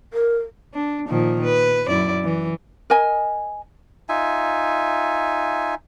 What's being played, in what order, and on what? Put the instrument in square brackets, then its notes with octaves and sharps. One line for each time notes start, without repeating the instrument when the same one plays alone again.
[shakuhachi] A#4
[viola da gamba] D4
A#2 D#3 F3
B4
F#2 E4 D5
E3
[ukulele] A#4 D#5 G#5
[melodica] D#4 F4 E5 G#5